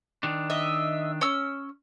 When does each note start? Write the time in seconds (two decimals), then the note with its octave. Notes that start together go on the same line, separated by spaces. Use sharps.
0.23 D#3 D4
0.50 D#5 E5
1.21 C#4 E6